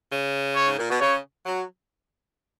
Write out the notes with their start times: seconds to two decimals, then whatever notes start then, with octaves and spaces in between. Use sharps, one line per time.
0.11 C#3
0.55 C#5
0.66 G#2
0.78 A#2
0.90 B2
1.00 C#3 C#5
1.46 F#3